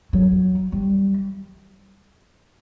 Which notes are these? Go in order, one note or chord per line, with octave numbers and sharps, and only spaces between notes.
F#3
G3